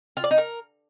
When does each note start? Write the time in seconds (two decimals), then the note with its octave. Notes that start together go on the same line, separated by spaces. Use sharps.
0.17 F4
0.24 D5
0.31 D#4
0.38 A#4